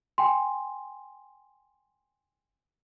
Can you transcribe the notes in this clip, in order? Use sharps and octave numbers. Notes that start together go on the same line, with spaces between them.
G5 G#5 C6